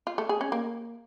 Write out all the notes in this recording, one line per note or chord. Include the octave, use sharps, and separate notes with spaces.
F4
A3
G#4
C#4
A#3